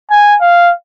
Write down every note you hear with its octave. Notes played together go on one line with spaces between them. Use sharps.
G#5
F5